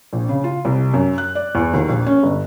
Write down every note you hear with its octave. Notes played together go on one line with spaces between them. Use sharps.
A#1
C#3
F4
C2
F#2
F#6
D5
E2
D#2
A#1
C#4
G1